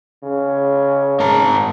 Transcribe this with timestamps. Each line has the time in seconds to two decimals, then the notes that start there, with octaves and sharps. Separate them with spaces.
0.23 C#3
1.20 G#2 A#4 A5